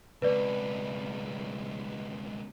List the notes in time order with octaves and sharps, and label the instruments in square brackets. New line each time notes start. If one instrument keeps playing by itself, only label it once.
[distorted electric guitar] C#2 B2 [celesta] B4 D5